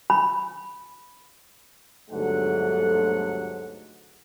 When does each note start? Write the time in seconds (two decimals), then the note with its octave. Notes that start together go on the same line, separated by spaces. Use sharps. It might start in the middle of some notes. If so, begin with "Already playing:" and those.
0.10 B5
2.10 G1 D2 G#2 F#3 A3 F#5